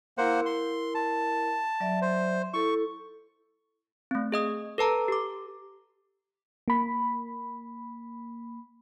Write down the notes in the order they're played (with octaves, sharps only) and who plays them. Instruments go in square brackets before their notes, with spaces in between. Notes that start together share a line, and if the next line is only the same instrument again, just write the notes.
[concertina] A#3 C5 F#5 [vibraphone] E4 A#4
[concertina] C6
A5
[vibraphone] F#3 D5 E5
[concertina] C5
[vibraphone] E4 A4 [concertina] C#6
[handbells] A3 C4
G#4 D#5 D#6
A4 B4 A5 A#5
G4 D6
[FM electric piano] A#3 B5